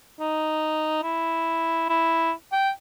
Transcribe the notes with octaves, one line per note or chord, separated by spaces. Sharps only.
D#4
E4
E4
G5